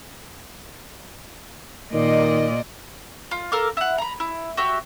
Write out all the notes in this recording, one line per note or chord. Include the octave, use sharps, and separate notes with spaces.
A#2 D#3 D5 D#5
F4
A4 A#4 F5 D6
E4 F#5
A#5 B5
E4
F#4 G4 E5